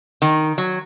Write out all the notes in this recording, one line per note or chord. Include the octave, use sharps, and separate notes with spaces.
D#3
F#3